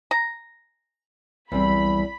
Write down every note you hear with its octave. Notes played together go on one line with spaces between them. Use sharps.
A#5
B1 E2 G3 C4 B5